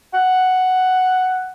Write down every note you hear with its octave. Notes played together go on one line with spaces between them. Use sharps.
F#5